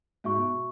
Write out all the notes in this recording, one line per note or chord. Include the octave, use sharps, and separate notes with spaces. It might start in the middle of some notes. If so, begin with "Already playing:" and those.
G#2 F#4 E5 C#6
B2